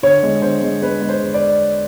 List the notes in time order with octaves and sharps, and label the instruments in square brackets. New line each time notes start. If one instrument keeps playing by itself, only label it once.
[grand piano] D3 C#5
G#3
D3 C5
G#3
G#3 B4
G#3
C5
G#3
D5